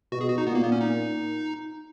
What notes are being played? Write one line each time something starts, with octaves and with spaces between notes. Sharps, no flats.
B2 F#4
G#4
F#4
D#4
A#2 B3
A#3
B3
C#4
D#4